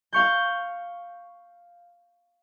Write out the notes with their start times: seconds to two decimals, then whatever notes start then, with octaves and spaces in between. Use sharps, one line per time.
0.13 F5 C#6 G6